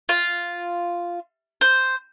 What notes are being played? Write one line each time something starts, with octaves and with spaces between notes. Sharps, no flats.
F4
C5